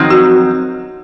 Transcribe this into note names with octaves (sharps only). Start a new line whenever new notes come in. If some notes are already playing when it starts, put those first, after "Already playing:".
Already playing: F2 D#3 F#3 C4 D#4
F#4